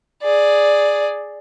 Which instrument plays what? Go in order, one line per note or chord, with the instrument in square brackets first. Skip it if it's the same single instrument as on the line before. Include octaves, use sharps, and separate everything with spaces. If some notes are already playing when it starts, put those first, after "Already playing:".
[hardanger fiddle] G#4 D5